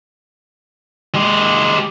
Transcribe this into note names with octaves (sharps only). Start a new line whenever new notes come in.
G#3 G4